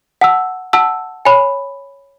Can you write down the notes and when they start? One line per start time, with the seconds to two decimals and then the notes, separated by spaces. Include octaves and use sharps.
0.21 F#5 A5 E6
0.73 F#5 A5 E6
1.25 C#5 G#5 B5